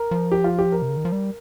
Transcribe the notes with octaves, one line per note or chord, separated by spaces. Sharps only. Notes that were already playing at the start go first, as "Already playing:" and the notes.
Already playing: A#4
F3
G4
F4
G4
A#4
C3
C#3
D#3
F3
G3